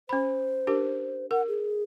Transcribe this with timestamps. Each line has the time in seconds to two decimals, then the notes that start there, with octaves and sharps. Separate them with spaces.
0.09 C#4 C5 B5
0.67 D4 G4 A#4
1.31 A#4 F#5
1.48 G#4